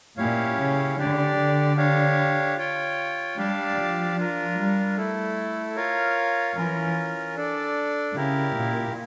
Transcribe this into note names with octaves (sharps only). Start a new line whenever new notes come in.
A#2 C#4 E4 G4 C#5 F5
C#3
D3 D4 G4 D5
D3
D4 G4 C#5 F5
F4 C#5 G5
G3 D4 G4 D5 F5 A5
F3
D4 F4 A#4
G3
A3 E4 A4
F4 A#4 C#5 F5
E3 C#4 F4 A#4
D4 A4 D5
C#3 E4 G4 A#4
A#2